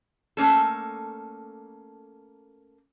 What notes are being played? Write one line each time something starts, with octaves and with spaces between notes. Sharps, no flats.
A3 A#3 C#4 A4